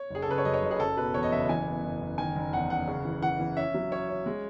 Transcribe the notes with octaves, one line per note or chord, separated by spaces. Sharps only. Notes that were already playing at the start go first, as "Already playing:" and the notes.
Already playing: C#5
F#1 G#4
A4
C#3 B4
C#5
F#2 D#5
C#5
F#1
G#4
F#1 A4
B2 B4
E2 C#5
D#5
F#1 E5
E3 G#5
B3
F#1
F#1
D#3 G#5
F#1
E2 F#5
F#1 F#5
C#3
E3
E3 F#5
E3
C#4 E5
F#3
C#4 C#5
C#4
G#3